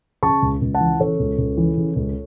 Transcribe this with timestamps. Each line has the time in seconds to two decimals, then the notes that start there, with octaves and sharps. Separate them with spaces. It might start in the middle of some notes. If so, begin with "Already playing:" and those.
0.23 C#3 A5 C#6
0.42 C#2
0.62 C#2
0.74 F#5 A5
0.80 E3
1.00 C#3 A4 C#5
1.20 C#2
1.38 C#2
1.57 E3
1.77 C#3
1.96 C#2